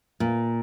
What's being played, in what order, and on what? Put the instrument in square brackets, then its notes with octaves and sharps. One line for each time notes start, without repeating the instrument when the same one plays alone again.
[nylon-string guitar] A#2